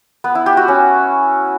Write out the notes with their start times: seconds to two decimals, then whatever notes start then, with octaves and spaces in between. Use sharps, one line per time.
0.24 B3
0.35 E4
0.46 G4
0.57 F#4
0.68 C#4